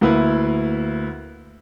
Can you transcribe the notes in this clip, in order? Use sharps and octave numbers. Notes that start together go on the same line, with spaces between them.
D2 A#3 E4 B4